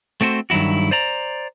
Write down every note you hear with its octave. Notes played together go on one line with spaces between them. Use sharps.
A3 C4 F#4 A#4 C5
G2 D#3 F#3 E4 F#4
C5 D5 A#5